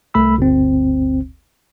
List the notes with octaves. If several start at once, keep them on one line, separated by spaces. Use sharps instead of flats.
C2 A3 B5 E6
G1 D2 C4